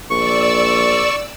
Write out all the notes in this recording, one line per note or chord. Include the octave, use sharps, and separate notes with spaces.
A#1 D5 C#6 E6